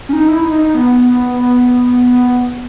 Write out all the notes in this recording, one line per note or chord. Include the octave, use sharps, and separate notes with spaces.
C#4
D#4
E4
D#4
D#4
B3